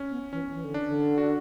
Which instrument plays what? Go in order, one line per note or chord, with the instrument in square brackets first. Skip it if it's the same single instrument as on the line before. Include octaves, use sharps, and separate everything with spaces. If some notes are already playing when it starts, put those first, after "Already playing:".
Already playing: [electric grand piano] C#4
[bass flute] B3
[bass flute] E3 [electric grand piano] C#4
[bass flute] E3
D3
[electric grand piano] D4
[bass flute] D3
[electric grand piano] F#4